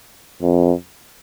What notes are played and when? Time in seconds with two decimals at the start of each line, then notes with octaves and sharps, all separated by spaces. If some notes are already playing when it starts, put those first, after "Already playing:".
0.42 F2